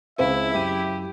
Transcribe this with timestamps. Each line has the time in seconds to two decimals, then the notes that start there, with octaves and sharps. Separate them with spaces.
0.18 C#2 C4 E4 E5 F5
0.54 F#2 G4 D#7